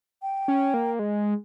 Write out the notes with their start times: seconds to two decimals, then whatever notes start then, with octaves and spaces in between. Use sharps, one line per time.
0.22 G5
0.48 C#4
0.74 A#3
0.99 G#3